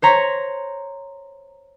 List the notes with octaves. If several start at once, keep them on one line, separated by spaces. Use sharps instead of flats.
C5 C#5 A#5 B6